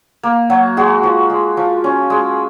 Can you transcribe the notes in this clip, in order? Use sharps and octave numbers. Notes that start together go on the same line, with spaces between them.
A#3
F#3 F#4
G#3 F#4
F3
G#3
F3
C#4
G#3